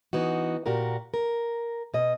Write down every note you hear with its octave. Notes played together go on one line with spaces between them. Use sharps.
E3 B3 D#4 F#4
A#2 F#4 G4 A#4
A#4
B2 D#5